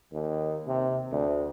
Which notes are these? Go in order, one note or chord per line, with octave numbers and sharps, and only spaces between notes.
D#2
C3
D2